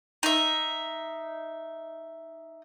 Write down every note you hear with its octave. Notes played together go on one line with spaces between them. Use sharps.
D#4 E5